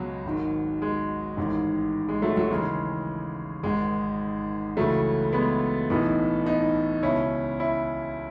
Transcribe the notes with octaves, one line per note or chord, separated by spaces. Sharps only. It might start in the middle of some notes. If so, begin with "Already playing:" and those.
Already playing: C#2 B2 F#3 G#3
G#1 G#2 D#3
G#3
A1 G#2 D#3
G#3
F#3 A3
F#3
D#2 C#3 E3 G#3
G#1 G#2 D#3 G#3
C#2 C#3 E3 F#3 A3
G#3 B3
B1 A2 E3 B3 D#4
B3 D#4
C#2 B2 C#4 E4
C#4 E4